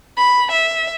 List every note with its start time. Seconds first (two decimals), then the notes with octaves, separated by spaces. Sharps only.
0.17 B5
0.51 E5